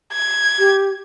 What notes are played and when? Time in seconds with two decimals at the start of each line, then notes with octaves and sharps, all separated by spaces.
0.13 G#6
0.58 G4